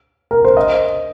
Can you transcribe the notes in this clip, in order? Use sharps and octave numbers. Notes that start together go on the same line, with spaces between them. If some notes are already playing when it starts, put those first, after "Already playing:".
A#4
C5
D#5